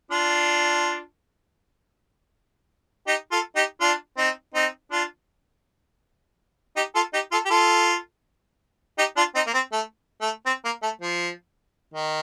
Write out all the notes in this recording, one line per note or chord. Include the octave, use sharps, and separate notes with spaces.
D4 F4
D#4 G4
F4 A4
D#4 G4
D4 F4
C4 D#4
C4 D#4
D4 F4
D#4 G4
F4 A4
D#4 G4
F4 A4
G4
F4 A4
D#4 G4
D4 F4
C4 D#4
A#3
C4
A3
A3
C4
A#3
A3
F3
D#3